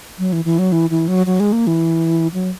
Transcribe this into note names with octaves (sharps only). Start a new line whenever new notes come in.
F#3
E3
E3
F#3
E3
E3
F#3
F#3
G#3
A#3
E3
F#3